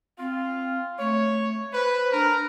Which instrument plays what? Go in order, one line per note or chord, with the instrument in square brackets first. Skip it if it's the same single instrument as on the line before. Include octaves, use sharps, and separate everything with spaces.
[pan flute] C4 [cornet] F4
[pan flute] A3 [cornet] C#5
[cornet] B4 [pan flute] C5
[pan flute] D4 [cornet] A#4